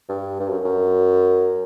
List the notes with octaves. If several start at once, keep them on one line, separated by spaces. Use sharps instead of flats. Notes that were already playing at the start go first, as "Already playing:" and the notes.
G2
G2
F#2
F#2